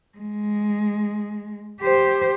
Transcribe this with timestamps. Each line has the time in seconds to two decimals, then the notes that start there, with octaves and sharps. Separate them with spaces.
0.18 G#3
1.81 G4 C5